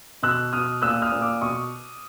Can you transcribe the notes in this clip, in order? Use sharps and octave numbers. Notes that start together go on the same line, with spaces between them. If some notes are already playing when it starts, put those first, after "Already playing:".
B2 E6 F#6
B2 D#6 F6
A#2 E6 F#6
D#6 F6
A#2
D6 E6
B2 C#6 D#6